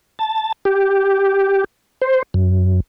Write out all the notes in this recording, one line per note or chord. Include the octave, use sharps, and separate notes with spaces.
A5
G4
C5
F#2